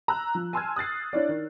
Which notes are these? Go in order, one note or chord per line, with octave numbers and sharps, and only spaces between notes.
A#5 E6 F#6
F3
G#5 A5 C6 E6 F6 G#6
D#6 F#6 A6 C7
D4 E4 C#5 D5
D#3